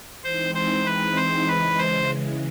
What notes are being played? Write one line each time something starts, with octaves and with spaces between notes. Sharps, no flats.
E3 G#3 C4 D#4 C5
C5
B4
C5
C#3 E3 G#3 B4
C5